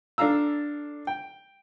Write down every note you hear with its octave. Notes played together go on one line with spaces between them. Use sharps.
D4 A4 F5 A#5 E6
G5